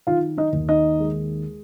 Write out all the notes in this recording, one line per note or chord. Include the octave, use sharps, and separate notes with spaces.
D#3 F4 F5
D#4 D#5
D#2
D#4 D#5
G#3